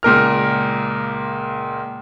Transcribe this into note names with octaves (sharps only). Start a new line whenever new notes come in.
C#2 A#2 A#4 F6